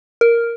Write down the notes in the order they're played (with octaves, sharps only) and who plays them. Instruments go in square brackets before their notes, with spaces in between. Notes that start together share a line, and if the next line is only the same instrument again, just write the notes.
[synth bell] A#4